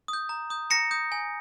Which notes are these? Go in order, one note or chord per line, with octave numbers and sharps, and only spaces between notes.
D#6
G6
A#5
D#6 G6
A#5 A#6 C#7
D#6 G6
G#5